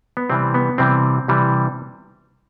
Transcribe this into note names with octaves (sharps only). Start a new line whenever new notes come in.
B3
C3 E3 G3 C4
B3
C3 E3 G3 C4
C3 E3 G3